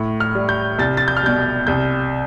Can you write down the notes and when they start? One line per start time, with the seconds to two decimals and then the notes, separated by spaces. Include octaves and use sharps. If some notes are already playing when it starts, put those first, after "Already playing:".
Already playing: A2
0.20 F6
0.35 G3
0.49 G6
0.78 C2 A6
0.97 A6
1.08 G6
1.17 F6
1.23 B2 G3 G6
1.67 C2 G6